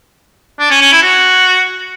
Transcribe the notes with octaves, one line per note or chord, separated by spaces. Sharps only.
D4
C#4
C#4
E4
F#4